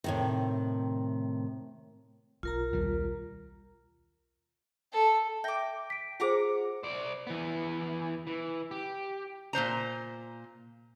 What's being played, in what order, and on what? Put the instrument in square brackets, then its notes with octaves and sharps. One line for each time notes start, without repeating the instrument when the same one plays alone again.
[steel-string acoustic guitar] A2 C3 D#3
[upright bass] B1 [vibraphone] F4 A#4 A#5
[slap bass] D#2 G3
[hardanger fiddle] A4
[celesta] E5 A#6 [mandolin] G5 D6
[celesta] B6 D7
[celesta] F4 G#4 C5 [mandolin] F#5 A#5 D6
[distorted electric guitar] C5 D5
E3 B3
E3
G4
[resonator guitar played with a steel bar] A#2 A3 C5 A#5